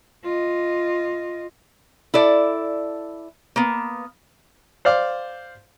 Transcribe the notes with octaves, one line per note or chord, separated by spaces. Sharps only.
F4 D#5
E4 A4 D5
A#3 B3
C5 D5 F5